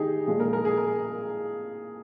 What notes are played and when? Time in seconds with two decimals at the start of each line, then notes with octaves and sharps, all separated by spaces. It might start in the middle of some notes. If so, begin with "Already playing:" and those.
Already playing: D#3 D#4 G4 G#4
0.27 A#2 F3 G#3 G#4
0.40 A#4
0.53 A#4
0.65 G#4
0.78 A#4